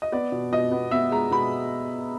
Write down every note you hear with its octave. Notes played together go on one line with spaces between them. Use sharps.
D#5
B3 D5
B2
B2 D#5
B3
B3 E5
G#3 A#5
B2 B5